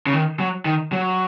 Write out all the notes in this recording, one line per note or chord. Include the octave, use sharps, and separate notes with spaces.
C#3
D#3
F#3
D#3
F#3